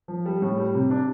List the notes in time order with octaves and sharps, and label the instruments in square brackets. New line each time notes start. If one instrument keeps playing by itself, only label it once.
[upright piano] F3
G3
A2
G3
C3
D4